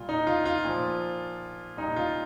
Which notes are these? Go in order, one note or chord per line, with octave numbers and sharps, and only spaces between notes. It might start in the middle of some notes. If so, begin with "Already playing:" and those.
Already playing: A#2 G3 F4
D#4
F4
F4
A#2 F3
A#2 G3 D#4
F4